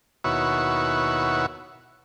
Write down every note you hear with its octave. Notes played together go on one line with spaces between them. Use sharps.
D#2 B2 E4 F#4 C#5